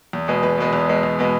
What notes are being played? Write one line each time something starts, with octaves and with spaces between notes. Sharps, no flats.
E2
B2 G#3 B3
E2 B4
B2 G#3 B3
E2
B2 G#3 B3
E2
B2 G#3 B3